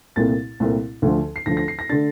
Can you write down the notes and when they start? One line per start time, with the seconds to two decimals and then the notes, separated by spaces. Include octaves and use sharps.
0.16 C2 A#2 A3 C4 A6
0.60 C2 A#2 A3 C4
1.02 D2 D3 F3
1.36 C7
1.46 D2 D3 F3 A#6
1.57 A#6
1.68 C7
1.79 A#6
1.89 D3 A3 D4 A6